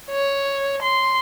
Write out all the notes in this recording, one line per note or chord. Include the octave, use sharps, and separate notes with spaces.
C#5
C6